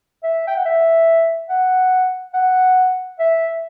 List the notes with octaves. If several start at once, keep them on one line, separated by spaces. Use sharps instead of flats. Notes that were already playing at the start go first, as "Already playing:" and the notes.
E5
G5
F#5
E5
F#5
F#5
E5